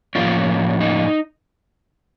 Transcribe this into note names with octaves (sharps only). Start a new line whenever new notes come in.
A2 F3 A#3 C#4 F4
D#4